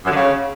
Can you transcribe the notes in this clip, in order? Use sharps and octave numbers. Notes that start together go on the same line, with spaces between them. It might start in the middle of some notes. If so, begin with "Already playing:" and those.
F#2
D3
C#3